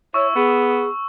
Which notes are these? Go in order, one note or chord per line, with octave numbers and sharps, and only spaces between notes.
E4 C#5 C#6 E6
B3 G#4